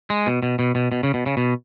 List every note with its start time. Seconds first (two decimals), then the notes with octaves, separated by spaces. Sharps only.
0.10 G#3
0.26 B2
0.43 B2
0.59 B2
0.75 B2
0.92 B2
1.03 C#3
1.14 B2
1.26 C#3
1.37 B2